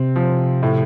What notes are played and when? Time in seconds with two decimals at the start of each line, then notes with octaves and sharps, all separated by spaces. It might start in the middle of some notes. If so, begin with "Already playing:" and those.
Already playing: C3 C4
0.16 F3
0.63 A2